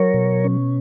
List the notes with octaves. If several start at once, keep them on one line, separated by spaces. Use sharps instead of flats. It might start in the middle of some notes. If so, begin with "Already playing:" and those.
Already playing: F#3 A#4 C#5
B2
C#4